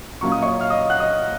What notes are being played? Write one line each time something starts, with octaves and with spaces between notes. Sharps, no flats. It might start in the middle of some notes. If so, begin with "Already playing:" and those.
A#2 F#3 A#3 C#4 C#6
D#6
C#5 C#6
F5 F6
D#5 D#6
F#5 F#6
D#5 D#6